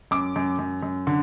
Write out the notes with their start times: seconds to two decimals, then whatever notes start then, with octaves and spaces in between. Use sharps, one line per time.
0.11 F#2 D6
0.36 F#2
0.59 F#2
0.83 F#2
1.07 D3